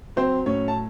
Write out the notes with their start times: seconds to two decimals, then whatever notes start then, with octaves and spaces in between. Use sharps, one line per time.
0.16 F#3 C4 C5
0.46 A2 C#4 C#5
0.68 A5